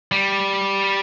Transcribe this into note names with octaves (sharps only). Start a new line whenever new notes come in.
G3